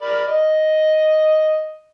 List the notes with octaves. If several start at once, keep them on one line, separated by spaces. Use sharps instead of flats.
A#4 D5 B5
D#5